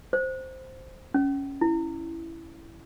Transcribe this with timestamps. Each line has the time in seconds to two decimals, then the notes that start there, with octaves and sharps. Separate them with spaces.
0.13 C5
1.14 C#4
1.61 E4